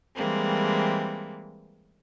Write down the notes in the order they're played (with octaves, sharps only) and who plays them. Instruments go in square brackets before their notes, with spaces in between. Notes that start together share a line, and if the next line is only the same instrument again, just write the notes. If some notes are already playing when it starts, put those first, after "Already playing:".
[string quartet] E3 G3 G#3 A#3 C4